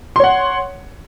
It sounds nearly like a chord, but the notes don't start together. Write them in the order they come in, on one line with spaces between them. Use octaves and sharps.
C6 C#5 F#5